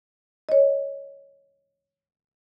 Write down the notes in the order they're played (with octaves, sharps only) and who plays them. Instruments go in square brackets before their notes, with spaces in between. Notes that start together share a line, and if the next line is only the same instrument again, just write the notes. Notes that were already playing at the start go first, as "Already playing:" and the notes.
[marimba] C#5 D#5